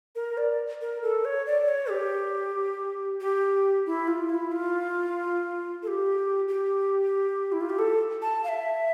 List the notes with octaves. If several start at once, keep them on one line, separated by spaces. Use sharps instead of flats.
A#4
D5
A#4
A4
C#5
D5
C#5
G4
G4
E4
F4
E4
F4
A4
G4
G4
E4
F4
G4
A4
A5
F5
E5